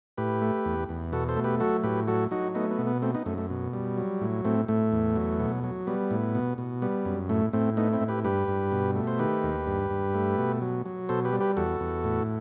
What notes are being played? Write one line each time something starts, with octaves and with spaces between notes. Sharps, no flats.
A2 G4 B4
A3
E2
E2
B2 F#4 A4
A4 C5
A3
G4 B4
F#3 F#4 A4
A2 G4 B4
F#3 F#4 A4
F#3 D#4 F#4
A3 B3 D#4
B3
B2
B3
A3 C4
B3 D#4
F#2 A3
A3
B2
G3
F#3
A2
A2 A3 C4
A2 A3
E2
F#3
B2
F#3
G3 B3
A2
B2
B2
G3 B3
F#2
A2 A3
A2 A3 C4
A3 B3 D#4
C4 E4
A2
G4 B4
G2 G4 B4
G2
B2
A3
C5
D#3 G4 B4
D#2
G2
G2
A3
B2
F#3
F#3
B2 A4 C5
G4 B4
G3
G4 B4
E2 F#4 A4
E2
A2